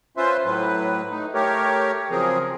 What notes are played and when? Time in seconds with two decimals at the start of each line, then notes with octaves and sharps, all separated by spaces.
0.17 C#4 F4 B4 C5 E5 C6
0.45 A2 F#3 B4
1.11 A3 D#4
1.34 A3 G4 A#4 C#5
2.10 C#3 F3 F#3 C4 G#4 A#4